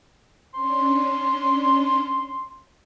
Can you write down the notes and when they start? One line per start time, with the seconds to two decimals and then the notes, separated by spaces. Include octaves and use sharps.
0.54 C#4 D4 C6